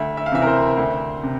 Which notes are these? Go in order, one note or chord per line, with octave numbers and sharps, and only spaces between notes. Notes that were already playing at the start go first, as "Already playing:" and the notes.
Already playing: D2 E5
E5
F5
C3 E3 E5
A#4
C5
D2
C3